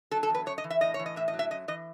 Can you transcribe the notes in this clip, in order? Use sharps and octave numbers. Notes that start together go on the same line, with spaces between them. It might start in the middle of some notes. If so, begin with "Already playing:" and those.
F#3 A4
A4
E2 B4
F#2 C#5
D#5
E3
E5
A2 D#5
C#5
E3
D#5
A2 E5
D#5
F#3
E5
F#2 D#5
E3 D#5